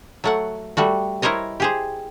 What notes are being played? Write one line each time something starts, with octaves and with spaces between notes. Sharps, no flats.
F#3 A3 F#5
G3 A3 F#4
E4 A#4 C5 C#5 D#5
G4 G#4 C5